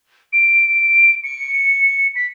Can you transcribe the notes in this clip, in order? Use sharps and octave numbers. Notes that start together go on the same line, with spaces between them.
D7
C#7
B6